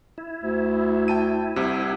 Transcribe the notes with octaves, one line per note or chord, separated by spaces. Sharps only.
E4
D2
G5 A5 D#7
C2 C3